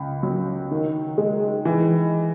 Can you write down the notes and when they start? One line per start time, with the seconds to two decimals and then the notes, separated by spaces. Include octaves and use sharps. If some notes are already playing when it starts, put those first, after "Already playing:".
Already playing: C#2
0.23 F#3
0.71 D#3
1.18 G#3
1.65 E3